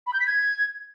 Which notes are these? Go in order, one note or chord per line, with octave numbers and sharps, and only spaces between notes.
B5
G6
B6
G#6